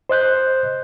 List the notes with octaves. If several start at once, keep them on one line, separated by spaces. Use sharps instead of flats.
C5 D#5 F#6 G6